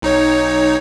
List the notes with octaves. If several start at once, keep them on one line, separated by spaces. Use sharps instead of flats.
B1 D#4 C#5